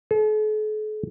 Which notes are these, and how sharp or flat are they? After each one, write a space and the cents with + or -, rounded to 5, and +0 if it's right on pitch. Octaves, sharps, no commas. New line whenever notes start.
A4 -45